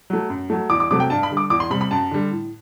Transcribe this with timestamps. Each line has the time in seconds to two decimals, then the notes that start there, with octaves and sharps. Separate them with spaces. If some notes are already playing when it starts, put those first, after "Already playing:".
0.10 F#3 A3
0.30 F#2
0.50 F#3 A3
0.70 E2 D6
0.80 D6
0.91 C3 F#3 A3 D6
1.00 G5
1.10 G2 A5
1.23 B5
1.30 D3 G3
1.37 D6
1.50 E2 D6
1.60 C6
1.70 C3 G3 B5
1.81 B5
1.91 F#2 A5
2.11 D3 G3
2.31 A2